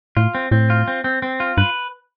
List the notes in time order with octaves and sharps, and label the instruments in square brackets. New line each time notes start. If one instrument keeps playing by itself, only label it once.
[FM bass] A2 [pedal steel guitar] F4
[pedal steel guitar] C4
[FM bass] A2 [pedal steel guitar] C4
[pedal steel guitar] F4
C4
C4
C4
F4
[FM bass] G2 [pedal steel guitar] B4